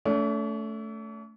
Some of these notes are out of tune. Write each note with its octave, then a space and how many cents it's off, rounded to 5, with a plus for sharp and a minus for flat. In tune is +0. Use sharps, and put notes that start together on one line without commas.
A3 +0 C#4 +45